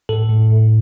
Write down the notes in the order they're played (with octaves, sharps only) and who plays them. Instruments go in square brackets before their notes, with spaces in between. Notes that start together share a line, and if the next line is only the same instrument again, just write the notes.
[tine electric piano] A2 A4
A2
A2